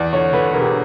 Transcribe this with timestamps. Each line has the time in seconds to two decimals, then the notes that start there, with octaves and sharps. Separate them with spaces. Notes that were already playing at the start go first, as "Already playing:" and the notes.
Already playing: E2 D5
0.13 D3 C#5
0.33 D3 B4
0.53 E1 A#4
0.61 G4